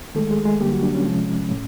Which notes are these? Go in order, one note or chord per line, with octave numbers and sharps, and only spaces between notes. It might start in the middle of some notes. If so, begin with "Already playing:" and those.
D#3 G#3 A3 A4
G#3 G#4
G#3 G#4
D3 G3 A#3 G4
F#3 F#4
D4
C#4
C3 F3 G#3
A2